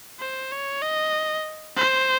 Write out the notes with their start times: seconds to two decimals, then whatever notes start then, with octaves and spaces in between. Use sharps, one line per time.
0.20 C5
0.52 C#5
0.82 D#5
1.77 C5